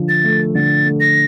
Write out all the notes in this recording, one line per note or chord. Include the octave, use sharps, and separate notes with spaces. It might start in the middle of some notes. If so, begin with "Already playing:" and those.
Already playing: D3 F3
A6
A3
D3 A6
A3
A#6